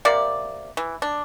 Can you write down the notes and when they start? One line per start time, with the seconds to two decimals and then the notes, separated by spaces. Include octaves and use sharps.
0.05 C3 A#3 D5
0.77 E3
1.02 D4